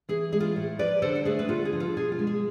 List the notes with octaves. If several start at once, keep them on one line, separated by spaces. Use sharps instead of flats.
E3 G#4
G#3 G#4
F4
A2
F3 B4 D5
D3 A4 C5
A4
A3 G#4 B4
B4
D3 F4 A4
G#4
F3
F4 A4
B2 G#4
F4
G#3
G#4